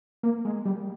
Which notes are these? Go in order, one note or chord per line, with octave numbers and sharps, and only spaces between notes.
A#3
G#3
G3